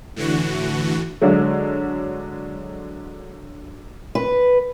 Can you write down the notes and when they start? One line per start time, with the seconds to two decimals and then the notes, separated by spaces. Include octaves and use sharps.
0.16 A2 D3 E3 F#4
1.22 D3 F#3 G#3
4.15 B4